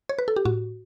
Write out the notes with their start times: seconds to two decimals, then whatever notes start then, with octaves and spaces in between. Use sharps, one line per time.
0.09 C#5
0.19 B4
0.28 A4
0.36 G4
0.45 A2 F#4